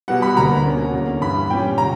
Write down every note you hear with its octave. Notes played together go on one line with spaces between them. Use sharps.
B2 G3 B3 F#5
B5
D2 D3 A#3 A#5
B2 A#3 C#4
E2 D3 A#3 C#4
G2 E3 B3 B5
A#2 G3 C#4 G5
D3 A#5